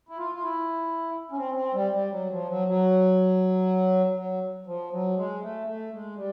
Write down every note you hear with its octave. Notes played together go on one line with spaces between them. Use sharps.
E4
F4
F4
E4
C#4
C4
C4
G3
G3
F#3
F3
F#3
F#3
F#3
F3
F#3
G#3
A3
A3
G#3
G3